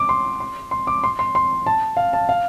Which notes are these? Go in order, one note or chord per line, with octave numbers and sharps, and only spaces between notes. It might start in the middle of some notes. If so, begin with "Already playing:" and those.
Already playing: D6
C6
C6
C6
D6
C6
C6
C6
A5
F5
A5
F5